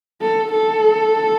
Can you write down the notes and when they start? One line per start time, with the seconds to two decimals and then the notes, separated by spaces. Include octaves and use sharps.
0.21 A4
0.51 A4